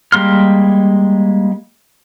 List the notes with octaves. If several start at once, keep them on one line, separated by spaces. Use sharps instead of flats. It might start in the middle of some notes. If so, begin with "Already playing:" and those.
G3 G#3 A#3 C6 F6